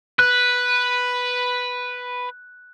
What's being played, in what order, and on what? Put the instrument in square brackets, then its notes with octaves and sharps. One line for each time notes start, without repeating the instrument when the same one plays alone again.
[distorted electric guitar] B4 [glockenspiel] F#6